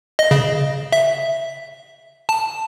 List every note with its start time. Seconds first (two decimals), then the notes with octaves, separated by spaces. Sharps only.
0.19 D#5
0.31 C#3
0.92 E5
2.29 A5